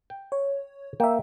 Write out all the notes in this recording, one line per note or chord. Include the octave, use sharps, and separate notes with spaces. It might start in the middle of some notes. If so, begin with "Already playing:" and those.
G5
C#5
A#3 E5 G5